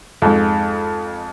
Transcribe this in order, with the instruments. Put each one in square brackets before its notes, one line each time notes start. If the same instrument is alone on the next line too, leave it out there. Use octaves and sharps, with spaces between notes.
[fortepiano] F2 G#2